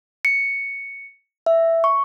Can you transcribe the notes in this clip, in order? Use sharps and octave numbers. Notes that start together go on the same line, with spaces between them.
C#7
E5
C#6